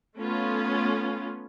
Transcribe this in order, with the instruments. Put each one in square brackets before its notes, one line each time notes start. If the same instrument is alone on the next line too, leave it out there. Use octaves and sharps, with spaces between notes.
[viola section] A3 B3 C#4 F4